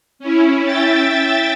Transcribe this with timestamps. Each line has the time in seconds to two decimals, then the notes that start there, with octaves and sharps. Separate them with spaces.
0.19 C#4 E4
0.64 E5 G5 A6